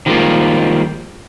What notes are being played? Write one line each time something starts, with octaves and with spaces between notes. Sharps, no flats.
D#3 F3 G3 G#3 A#3 F4